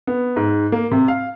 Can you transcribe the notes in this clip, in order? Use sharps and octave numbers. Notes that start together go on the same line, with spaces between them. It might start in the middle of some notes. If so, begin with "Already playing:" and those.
B3
G#2
A#3
C3
F5